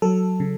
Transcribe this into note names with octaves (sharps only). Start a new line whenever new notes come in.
F#3 A4
C#3